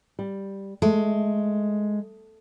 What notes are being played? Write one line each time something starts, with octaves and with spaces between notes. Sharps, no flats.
G3
G#3 A3